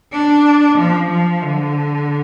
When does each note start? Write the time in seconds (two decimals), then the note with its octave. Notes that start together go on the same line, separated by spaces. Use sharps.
0.13 D4
0.78 F3
1.10 F3
1.43 D3